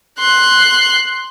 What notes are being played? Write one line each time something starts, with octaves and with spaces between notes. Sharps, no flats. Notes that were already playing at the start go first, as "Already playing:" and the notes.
C6 F#6